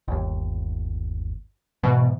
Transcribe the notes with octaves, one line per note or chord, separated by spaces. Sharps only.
G1 D#2
G#2 B2 E3